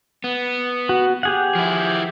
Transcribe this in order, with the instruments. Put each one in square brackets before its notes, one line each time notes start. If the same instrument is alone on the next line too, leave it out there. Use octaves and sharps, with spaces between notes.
[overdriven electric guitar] B3
[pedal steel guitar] F#4
G4 G#4 F#5
[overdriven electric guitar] F3 E4